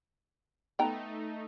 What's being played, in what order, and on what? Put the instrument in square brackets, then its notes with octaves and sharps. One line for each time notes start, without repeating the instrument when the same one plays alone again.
[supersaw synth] A3 D#4 [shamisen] B3 G5 A#5